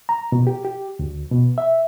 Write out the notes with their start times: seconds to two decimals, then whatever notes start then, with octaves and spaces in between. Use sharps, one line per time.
0.09 A#5
0.32 B2
0.47 G4
0.65 G4
0.99 D2
1.31 B2
1.58 E5